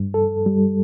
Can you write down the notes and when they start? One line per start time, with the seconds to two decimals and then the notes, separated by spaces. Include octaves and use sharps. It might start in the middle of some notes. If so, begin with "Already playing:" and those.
Already playing: G2
0.14 A4
0.46 G3